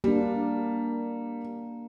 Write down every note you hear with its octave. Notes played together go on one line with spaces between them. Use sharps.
G3 A#3 D4